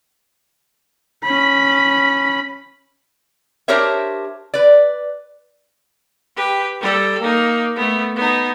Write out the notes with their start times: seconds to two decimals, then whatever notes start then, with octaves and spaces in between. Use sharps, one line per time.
1.24 C#4 B5
3.68 D4 G4 A#4 C5 C#5 E5
4.54 B4 D5
6.36 G4 B4
6.81 G3 A4
7.21 A#3 D#4
7.76 A3 B3
8.16 B3 D#4